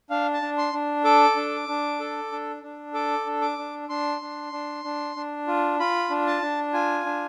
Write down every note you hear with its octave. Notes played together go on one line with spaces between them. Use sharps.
D4 F5
A5
D4
C6
D4
A4 D6
D4
D4
A4
D4
D4
A4 D6
D4
D6
D4
D4 C6
D4
D4
D4
D4
F4
F4 B5
D4
A5
D4
F4 G#5
D4